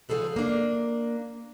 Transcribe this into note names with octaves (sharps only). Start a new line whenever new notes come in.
C#3 F3 F#3 G#4 A4 B4
A#3 D4